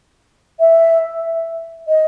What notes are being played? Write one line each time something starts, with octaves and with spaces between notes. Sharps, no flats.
E5
D#5